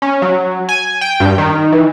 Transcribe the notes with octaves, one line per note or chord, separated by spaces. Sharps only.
C#4
F#3
G#5
G5
G2
D#3
E3